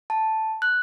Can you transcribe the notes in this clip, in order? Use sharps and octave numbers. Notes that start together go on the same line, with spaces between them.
A5
F#6